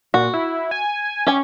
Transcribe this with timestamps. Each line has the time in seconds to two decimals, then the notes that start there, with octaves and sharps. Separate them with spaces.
0.14 A#2 F#4
0.34 E4
0.71 G#5
1.27 C#4 G4 G5 G#5